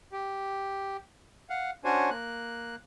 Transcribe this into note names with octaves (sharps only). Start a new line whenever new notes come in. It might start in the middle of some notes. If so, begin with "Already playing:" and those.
G4
F5 F#5
C#4 D4 F#4 C5 C#5 G#5
A#3 F#6